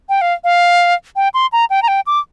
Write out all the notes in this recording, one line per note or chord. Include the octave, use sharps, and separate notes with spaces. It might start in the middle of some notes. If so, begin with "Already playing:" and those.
G5
F5
F5
G5
C6
A#5
G5
A#5
G5
D6